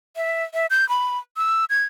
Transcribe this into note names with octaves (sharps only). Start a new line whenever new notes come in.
E5
E5
G6
B5
E6
G#6